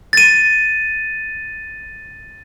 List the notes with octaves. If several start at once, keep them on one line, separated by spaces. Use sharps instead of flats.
A6 D#7